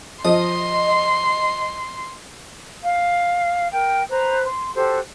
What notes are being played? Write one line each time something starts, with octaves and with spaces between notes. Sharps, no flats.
F3 D#5 C6
F5
A#4 G5
B4 C5 A#5
C6
F#4 G4 A4 C5